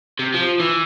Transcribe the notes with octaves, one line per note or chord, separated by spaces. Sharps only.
C3
F3
E3